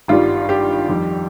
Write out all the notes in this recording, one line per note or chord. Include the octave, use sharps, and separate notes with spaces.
G#1 G2 D#3 G3 F4
G4
F2 D#3 G3